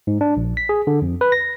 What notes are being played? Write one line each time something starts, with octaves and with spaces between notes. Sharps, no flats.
G#2
D4
A#1
B6
G#4
D3
F2
B4
A#6